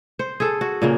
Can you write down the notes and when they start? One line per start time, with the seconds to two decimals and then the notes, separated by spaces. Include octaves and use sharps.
0.19 C5
0.40 G#4 A4
0.61 F#4
0.82 A#2 C#3 A#3